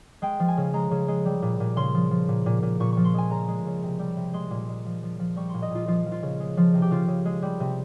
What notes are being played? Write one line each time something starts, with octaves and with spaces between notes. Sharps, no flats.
G#3 G5
F3
G#5
C#3
G#3 A#5
C#3
G#3
G3
A#2
A#2
C#3 C6
F3
F3
A#2
A#2
A#2
A#2 C#6
F3 C#6
C6
G#3 G#5
C#3 A#5
G#3
C#3
C3
G3
C3
G#3 C6
A#2
G#3
F3
F3
F3
G3 C#6
A#2 C6
D#5
A#2 F4
F3 F4
F3
F4
C#3
G#3
F3
C3
G4
C#3 F4
C#3
G#3
G3
C3